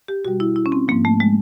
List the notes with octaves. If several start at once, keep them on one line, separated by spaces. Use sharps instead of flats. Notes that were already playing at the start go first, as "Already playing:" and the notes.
G4
B2 G3 F#4
E4
E4
C#4
C4
G#2 F3 A#3
A3
G#3